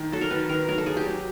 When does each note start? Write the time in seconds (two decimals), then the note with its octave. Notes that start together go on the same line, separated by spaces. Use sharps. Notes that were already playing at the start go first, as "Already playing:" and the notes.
Already playing: D#3
0.12 F#3 A4
0.21 A#4
0.30 D#3 B4
0.49 D#3 A#4
0.68 F#3 A#4
0.78 A4
0.86 F#3 G#4
0.97 G4
1.06 F#3